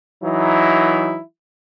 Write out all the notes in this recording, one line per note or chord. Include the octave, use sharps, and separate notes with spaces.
E3 F#3 D#4 E4